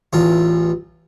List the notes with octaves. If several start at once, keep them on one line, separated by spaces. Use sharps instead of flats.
A1 E2 F4